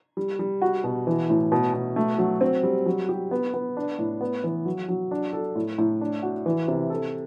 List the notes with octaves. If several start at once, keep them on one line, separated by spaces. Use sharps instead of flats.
G3
G3
F#4
B2
E3
A2
B2
B2
A3
F#3
C4
G3
F#3
G4
B3
B3
D4
A2
B3
E3
F#3
F#3
D4
A4
A2
A2
D4
F#4
E3
C3
A4